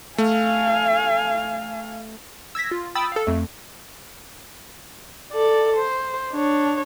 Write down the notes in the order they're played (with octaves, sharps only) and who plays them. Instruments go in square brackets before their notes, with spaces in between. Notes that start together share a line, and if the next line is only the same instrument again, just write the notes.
[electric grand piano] A3 [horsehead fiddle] F5 G#5
[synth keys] E6 G#6 A#6 B6
F4
G5 B5 D#6 E6 A6
A4 F5
F2 A3
[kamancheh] A4 D5
C5
D4 C#5